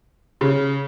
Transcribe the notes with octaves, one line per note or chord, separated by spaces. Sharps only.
C#3